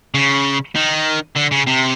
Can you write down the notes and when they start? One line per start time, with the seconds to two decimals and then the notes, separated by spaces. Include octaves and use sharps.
0.14 C#3
0.75 D#3
1.36 D3
1.52 C#3
1.67 C3